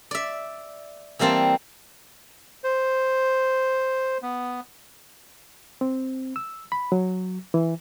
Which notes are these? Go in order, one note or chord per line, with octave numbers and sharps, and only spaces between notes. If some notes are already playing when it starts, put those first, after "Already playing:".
D5 E5
E3 G3 A#3 C4 A5
C5
B3
C4
E6
B5
F#3
E3